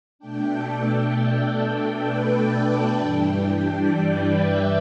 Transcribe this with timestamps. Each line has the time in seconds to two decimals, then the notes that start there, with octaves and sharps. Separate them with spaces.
0.19 B2 A3 D4 G5
0.54 A4
0.89 A4
1.59 A4
1.94 B4
2.28 D5
2.63 G5
2.99 G2 E3 G3 D4 G5
3.69 D5
4.04 B4
4.38 E5